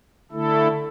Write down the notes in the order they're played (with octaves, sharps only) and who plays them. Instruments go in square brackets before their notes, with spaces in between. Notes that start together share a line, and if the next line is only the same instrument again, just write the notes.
[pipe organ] D3 A3 E4 A4